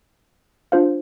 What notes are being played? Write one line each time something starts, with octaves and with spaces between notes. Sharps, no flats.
D4 F4 C5 F5